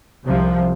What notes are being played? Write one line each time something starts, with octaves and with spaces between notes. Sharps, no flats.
C2 C3 F3